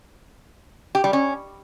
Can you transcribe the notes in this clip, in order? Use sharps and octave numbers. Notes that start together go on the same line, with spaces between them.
G4
G3
C#4